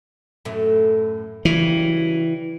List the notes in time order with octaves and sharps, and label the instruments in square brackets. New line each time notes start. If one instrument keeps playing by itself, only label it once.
[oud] F#2 A2 A3
[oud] C#3 F#3 G3 [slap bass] E3